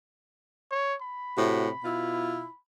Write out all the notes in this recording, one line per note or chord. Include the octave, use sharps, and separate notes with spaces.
C#5
B5
A2 C3 F#4
B2 E4 F4